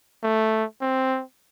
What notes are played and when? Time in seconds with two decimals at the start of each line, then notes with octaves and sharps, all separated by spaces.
0.23 A3
0.81 C4